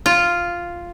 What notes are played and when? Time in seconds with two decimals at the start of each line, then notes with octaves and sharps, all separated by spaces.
0.06 F4